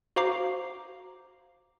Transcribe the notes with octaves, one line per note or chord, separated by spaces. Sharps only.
F#4 C5 F5 A#5 D6 C7